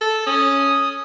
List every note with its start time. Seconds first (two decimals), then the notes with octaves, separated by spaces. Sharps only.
0.02 A4
0.27 C#4 D#6